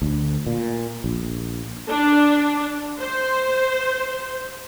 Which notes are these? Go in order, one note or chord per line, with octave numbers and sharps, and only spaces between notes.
D2
A#2
A#1
D4
C5